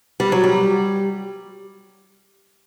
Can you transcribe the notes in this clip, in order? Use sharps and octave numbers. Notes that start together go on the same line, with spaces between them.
G3
F#3
G3